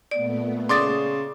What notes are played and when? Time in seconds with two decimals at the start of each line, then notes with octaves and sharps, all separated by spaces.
0.11 A#2 A3 B3 D5
0.69 C#3 D5 C6 D6 D#6 A6